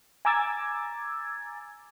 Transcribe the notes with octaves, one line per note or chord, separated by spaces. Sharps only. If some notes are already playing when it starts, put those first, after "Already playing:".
G#5 A#5 D6 E6 G#6 A6